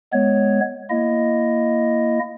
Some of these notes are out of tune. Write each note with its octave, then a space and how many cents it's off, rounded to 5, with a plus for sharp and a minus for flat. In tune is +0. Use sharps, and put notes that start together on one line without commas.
G#3 +0 B3 +0 C#5 +0
A#3 +0 E4 +20 D#5 +0